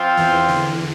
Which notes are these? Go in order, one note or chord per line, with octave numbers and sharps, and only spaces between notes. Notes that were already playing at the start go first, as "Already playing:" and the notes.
Already playing: F3 C4 F4
E2 E3
D3